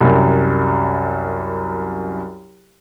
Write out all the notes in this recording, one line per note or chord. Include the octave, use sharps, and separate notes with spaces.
C2 F#2